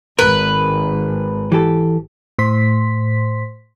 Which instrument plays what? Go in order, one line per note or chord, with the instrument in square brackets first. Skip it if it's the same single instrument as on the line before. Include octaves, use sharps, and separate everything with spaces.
[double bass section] G#1 [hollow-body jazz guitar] A#4 [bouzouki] B4
[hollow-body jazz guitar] E3 G4 A4
[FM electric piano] A2 C5 C6 B6